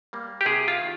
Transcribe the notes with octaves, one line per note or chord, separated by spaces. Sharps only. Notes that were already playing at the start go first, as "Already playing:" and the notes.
G3 A#3
G4
C3 G#4
F4
D#3